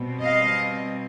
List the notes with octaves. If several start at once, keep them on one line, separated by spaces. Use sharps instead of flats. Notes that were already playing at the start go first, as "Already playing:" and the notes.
Already playing: B2 G3 C4
D#5 F5